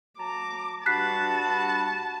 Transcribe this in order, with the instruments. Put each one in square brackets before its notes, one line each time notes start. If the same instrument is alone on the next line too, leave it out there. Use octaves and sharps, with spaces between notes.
[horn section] F#3 A5 A#5 [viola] D6
[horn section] G2 F#4 [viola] A5 [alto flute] B5 [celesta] F#6 B6 C7